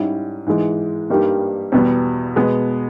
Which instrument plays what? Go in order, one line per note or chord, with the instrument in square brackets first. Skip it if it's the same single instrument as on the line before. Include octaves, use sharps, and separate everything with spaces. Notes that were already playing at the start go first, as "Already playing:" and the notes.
Already playing: [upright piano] G#2 G3 C#4 E4
G#2 E3 G#3
G2 G3 A#3 D#4 G4
E2 B2 G3 B3
B2 G#3 B3